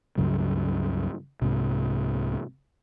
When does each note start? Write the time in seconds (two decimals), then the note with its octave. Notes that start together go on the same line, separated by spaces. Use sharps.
0.18 C#2 G2 C#3 F#3
1.42 C2 G#2 C3